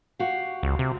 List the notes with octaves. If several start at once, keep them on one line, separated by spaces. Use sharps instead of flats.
F#4 G4 F5
C#2
C3